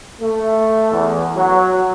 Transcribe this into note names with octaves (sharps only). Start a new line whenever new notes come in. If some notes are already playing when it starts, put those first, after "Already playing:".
A3
E2
F#3